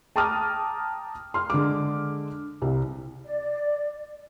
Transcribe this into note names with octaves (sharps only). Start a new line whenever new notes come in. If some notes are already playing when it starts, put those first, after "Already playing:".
G5 A5 A#5 D6 D#6 F6
C6 F6
D3 G#3 D6
C2 G3
D5